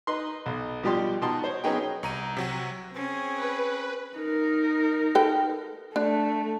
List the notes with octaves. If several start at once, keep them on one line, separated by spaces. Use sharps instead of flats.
D#4 B4 C6
B1
B2 F3 G3 G4 D5 C6
B2 D#4 F#4 A5 C6
C5 C#5
F#3 B3 C#4 D#4 G#4 G5
C2 A#5 D#7
C3 F#3 F#4
C4 C#4 G#4
B4
D#4 A#4
A4 B4 G5
A3 D4